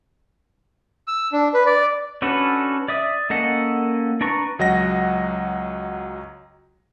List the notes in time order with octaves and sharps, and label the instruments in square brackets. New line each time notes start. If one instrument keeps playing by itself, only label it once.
[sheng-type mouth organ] E6
D4
B4
D5
[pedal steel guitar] C#4 D4 F#4 A4 B4
D5 E5 D#6
A#3 C#4 A4 D#5 F#5
D4 B4 A#5 C#6
[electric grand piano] C#2 F#3 D#5 F#5 A#6